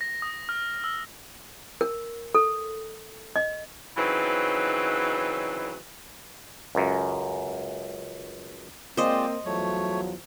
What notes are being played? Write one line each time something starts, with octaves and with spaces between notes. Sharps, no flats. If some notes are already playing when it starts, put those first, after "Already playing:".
A#6
D#6
F6
E6
A#4
A4
D#5
C#3 E3 F#3 C4 D#4 B4
C#2 F#2
G#3 A#3 C4 F4 C5 D5 D#5
E2 F3 F#3 A3 C#5